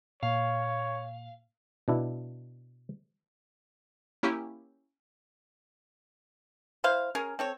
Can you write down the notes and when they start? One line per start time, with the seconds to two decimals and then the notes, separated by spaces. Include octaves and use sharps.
0.23 A#2 C#5 F5
1.88 B2 D4 E4
4.23 A#3 C#4 E4 G4
6.84 E4 C5 F5
7.15 C#4 G#4 A#4
7.39 C4 A4 C#5